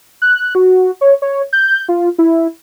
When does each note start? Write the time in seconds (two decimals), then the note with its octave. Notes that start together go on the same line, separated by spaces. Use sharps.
0.22 F#6
0.55 F#4
1.01 C#5
1.22 C#5
1.53 G6
1.88 F4
2.18 E4